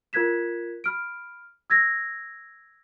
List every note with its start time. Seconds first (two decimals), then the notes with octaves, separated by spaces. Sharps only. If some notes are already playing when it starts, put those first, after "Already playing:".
0.13 F4 A#4 F#6 G#6 B6 E7
0.84 B5 F6 D7
1.70 E6 G#6 A#6